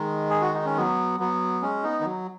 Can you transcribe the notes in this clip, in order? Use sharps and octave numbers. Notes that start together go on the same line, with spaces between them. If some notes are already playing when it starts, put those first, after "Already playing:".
Already playing: D#3 G#3
G#4
F#4
D#4
C#4
F#3 B3
F#3 B3
G#3 C#4
B3 D#4
D#3
F#3